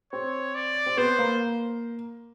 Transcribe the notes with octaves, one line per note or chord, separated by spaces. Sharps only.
C4 C#5
D5
C4
B3 C5
A#3